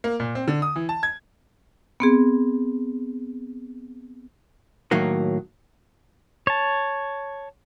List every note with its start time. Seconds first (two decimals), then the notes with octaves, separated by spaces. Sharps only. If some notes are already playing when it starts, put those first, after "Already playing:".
0.04 A#3
0.20 A#2
0.35 C4
0.47 D3
0.62 D#6
0.76 E3
0.89 A5
1.03 G#6
2.00 B3 C4 G#4
4.91 A2 D#3 F#3 A#3 F#4
6.47 C#5 A5